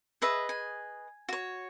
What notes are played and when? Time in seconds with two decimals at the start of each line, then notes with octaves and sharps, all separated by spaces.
0.22 G#4 B4 D#5 E5
0.49 G#5
1.29 F#4 C#5